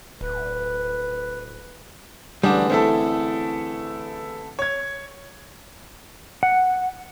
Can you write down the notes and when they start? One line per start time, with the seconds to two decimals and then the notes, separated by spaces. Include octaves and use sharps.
0.21 D1 B4
2.43 A1 D3 G3 D4 G#4
2.70 A3 C4 E4 A4
4.59 C#5 G#6
6.43 F#5